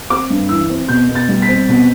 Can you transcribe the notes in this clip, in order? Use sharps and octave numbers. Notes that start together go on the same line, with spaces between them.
C4 D6
G2
E3 E6
C4
B2 G6
B2
A6
G3
B6
C4
B2